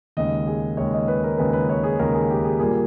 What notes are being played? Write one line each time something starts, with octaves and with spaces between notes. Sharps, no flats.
D#2 C#3 G#3 D#5
G#4
D#2 C#3 G#3 C#5
D#5
B4
A#4
D#2 C#3 G#3 B4
B4
C#5
G#4
D#2 C#3 G#3 A#4
G#4
G4
G#4
A#2 G3 A#3 G#4